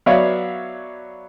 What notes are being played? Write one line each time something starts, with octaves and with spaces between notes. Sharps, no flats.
F#3 B3 C#5 D5 E5 F5